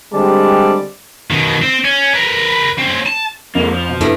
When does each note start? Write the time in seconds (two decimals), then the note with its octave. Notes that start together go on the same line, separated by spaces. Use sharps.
0.14 D3 G3 G#3 C4 D5 A5
1.31 B2 D#3
1.62 C4
1.85 C#4
2.14 A#4 B4
2.78 C4 C#4
3.06 A5
3.55 F2 G#3 A#3
3.73 F3
3.89 B2
4.01 G2 B3 E4 A4